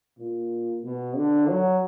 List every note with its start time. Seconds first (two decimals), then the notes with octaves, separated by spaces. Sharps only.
0.19 A#2
0.84 B2
1.16 D3
1.48 F#3